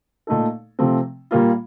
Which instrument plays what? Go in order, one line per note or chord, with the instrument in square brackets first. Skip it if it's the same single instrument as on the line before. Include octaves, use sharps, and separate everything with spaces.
[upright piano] A#2 A3 D#4 A4
C3 F3 A3 C4
A#2 G3 A#3 F4